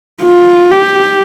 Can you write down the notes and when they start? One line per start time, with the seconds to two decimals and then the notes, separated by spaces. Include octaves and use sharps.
0.22 F4
0.71 G4